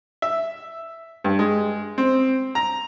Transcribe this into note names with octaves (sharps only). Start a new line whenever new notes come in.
E5
G2
G#3
C4
A#5